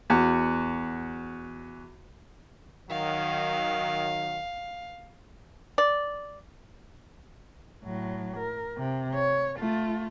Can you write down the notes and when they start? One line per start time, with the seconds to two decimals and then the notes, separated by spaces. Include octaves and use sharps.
0.10 E2 F#4
2.90 D#3 F#3 F5
5.78 D5
7.83 A2 F#3
8.38 A#4
8.77 C3
9.15 C#5
9.59 A3 F4